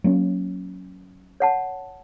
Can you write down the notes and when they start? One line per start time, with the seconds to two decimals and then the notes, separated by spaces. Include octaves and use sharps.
0.04 F#3 A#3 C#4
1.40 C#5 F#5 A5